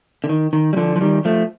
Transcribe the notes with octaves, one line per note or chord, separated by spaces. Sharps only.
D3
D#3
D#3
G3
D3 F3
F3
D#3 G3
F3 A3